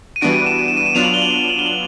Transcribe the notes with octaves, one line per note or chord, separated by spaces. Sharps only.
D#7
E3 G3 B3 D4 F#4 D7
D#7
E7
D#7
E7
D#7
E7
F#3 B3 D4 F4 F7
F#7
G7
F#7
F7
F#7
G7
F#7